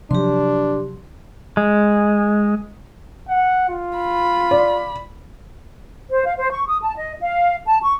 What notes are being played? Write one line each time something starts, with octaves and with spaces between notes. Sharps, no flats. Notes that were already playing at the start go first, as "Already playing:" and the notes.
C3 F3 F#3 D4 G4 C6
G#3
F#5
F4
B5
D5
C5
F5
C5
C#6
D#6
A5
D#5
F5
A5
C#6